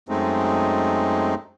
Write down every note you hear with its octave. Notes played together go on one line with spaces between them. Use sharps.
F#2 G#3 A3 C4 D#4